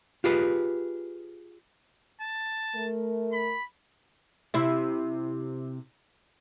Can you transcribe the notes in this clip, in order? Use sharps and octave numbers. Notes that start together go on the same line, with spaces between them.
F4 G4 G#4 B4
A5
A3 A#4
B5
C3 E4